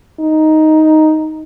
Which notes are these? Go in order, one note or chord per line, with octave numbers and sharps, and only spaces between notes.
D#4